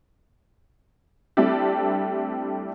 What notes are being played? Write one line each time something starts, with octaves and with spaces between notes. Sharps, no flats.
G3 A3 C4 D4 E4 G4